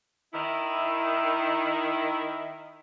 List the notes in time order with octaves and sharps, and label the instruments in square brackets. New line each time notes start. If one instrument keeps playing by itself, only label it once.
[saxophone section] D#3 E4